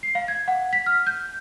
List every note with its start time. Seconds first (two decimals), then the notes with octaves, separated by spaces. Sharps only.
0.03 C7
0.15 F5
0.28 G#6
0.48 F#5
0.73 B6
0.86 F6
1.07 G6